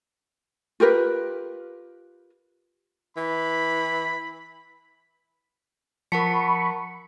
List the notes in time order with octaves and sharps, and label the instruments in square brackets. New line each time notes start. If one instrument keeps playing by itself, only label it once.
[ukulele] F4 G4 A#4 B4
[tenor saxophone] E3 [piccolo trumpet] B5
[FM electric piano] F3 [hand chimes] A#4 F#5 A5 [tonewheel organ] B5 C#6